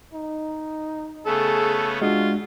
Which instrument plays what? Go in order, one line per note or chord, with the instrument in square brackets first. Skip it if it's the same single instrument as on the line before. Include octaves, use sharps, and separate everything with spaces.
[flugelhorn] D#4
[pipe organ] C#3 A3 B3 [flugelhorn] G#4 [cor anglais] A4
[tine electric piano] G#3 D4 [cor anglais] F4 [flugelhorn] F#4